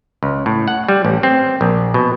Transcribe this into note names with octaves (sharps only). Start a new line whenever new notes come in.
C#2
A2
F#5
G3
A1
C4
A#1
B2